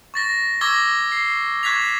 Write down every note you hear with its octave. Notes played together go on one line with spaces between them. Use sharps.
C#6 A6 A#6
C#6 D6 E6 G#6 A#6 G7
C7
C#6 F#6 G#6 B6 F7